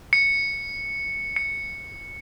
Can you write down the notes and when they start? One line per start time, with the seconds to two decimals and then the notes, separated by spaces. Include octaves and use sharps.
0.13 C#7
1.36 C#7